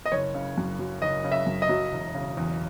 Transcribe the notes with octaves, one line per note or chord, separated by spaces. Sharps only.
D#5
F#1 C#5
C#3
F#2
F#3
F#1 D#5
C#3
E5
F#2
D#5
F#3
E1
C#3
E2